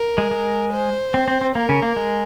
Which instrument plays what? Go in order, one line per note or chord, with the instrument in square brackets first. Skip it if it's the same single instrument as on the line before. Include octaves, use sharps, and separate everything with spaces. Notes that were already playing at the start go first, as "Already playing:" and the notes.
Already playing: [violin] A#4
[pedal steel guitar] G#3
G#3
[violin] C5
[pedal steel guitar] C4
C4
C4
[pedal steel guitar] A#3 [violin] A#4
[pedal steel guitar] C#3 C#4
A#3
G#3